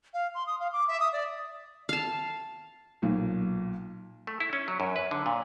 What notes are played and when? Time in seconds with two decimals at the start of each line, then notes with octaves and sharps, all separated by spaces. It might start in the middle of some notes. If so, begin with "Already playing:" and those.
0.14 F5
0.35 C6
0.47 D#6
0.60 F5
0.73 D6
0.88 E5
1.00 D#6
1.13 D5
1.89 F5 A5
3.02 B1 A#2
4.27 A3
4.40 E4
4.53 C#4
4.68 F#3
4.80 F#2
4.96 B4
5.11 D3
5.26 A#2